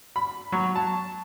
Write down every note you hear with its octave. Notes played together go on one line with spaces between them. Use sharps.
B5
F#3
A5